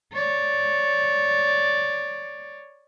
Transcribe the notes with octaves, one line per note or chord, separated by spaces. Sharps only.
C#5 D5